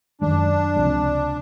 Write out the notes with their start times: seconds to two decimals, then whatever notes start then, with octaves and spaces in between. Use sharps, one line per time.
0.21 F#2 D#3 G#3 D4
0.76 C#2 C3 F3 G#3